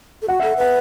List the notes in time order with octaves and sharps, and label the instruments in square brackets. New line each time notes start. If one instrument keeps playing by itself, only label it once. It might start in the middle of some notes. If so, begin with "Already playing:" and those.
[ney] A4
[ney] F#4 [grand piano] F#5
[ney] A4 [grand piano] E5
[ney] B4 [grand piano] F#5